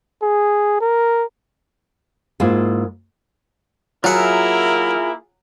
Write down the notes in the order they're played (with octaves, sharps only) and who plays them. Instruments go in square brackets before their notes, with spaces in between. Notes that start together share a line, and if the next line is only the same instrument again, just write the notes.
[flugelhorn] G#4
A#4
[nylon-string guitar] G#2 A#3 E4 F4 G#4
[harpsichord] F#3 F#5 [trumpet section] A#3 E4 A#4 [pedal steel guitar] F4 G#4 E5